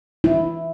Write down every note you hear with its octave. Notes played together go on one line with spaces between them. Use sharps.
E4